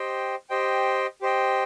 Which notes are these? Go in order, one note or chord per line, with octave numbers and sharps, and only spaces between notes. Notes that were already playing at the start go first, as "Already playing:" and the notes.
Already playing: G4 C5 D#5 G5
G4 C5 D#5 G5
G4 C5 D#5 G5